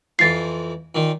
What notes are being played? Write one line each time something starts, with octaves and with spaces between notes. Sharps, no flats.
F2 E3 F3 A6 C7
A#2 D#3